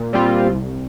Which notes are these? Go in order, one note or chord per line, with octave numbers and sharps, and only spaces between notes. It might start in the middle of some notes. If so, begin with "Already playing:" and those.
Already playing: A#2
G3 C4 F4
C2